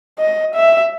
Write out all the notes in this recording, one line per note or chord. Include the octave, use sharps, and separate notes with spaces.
D#5
E5